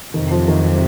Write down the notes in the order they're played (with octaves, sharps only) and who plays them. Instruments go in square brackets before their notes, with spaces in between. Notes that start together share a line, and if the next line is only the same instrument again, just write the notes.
[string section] F2 C3 F#3 [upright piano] D#3
[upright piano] F3
D#3
F3